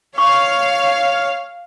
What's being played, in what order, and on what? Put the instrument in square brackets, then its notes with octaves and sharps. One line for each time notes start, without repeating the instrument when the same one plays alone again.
[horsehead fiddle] C#5 [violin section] F5 [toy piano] C#6